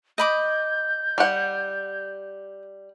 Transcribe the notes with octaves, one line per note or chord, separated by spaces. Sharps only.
D#5 B5 D6 G6
G3 F#5